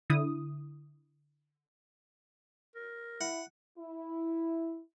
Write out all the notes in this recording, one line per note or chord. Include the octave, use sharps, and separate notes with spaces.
D3 E4 D#6
A#4
E4 F#5
E4